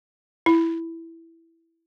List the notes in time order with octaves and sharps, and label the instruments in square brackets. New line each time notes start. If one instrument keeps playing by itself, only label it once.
[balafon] E4